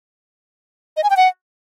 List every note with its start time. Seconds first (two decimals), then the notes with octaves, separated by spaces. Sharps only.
0.97 D#5
1.03 G#5
1.10 G5
1.17 F#5